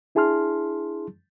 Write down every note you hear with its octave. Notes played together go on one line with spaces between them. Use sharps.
D4 E4 G#4 A5 C6 F6